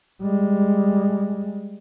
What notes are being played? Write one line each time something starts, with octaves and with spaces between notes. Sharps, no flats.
G3 G#3